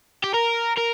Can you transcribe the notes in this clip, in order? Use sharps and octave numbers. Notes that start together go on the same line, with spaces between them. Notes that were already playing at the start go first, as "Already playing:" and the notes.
G4
A#4
A#4